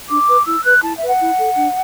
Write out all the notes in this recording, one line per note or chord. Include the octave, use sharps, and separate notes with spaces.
D4 D6
B4
E4 E6
B4 F#6
E4 A5
E5
B4
F#5
E4
A4
D4